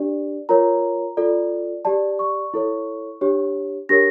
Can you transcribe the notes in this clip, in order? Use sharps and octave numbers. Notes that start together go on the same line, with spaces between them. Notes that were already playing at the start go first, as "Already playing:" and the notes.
Already playing: D4 G4 D5
F4 A#4 C#5 A#5
F4 A4 D5
G4 D5 A5
C#6
E4 A4 C#5
D4 G4 C#5
D4 G4 A#4 C#5 A#6